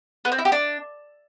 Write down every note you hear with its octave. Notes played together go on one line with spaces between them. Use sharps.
B3
C4
E4
G4
D4